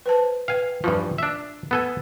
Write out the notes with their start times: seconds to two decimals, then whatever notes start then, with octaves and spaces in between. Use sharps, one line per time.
0.06 B4 C5 A5
0.48 B4 F5 G5 G#5
0.84 G2 E3 F3 F4
1.18 D4 E5
1.71 B3 A4 G#5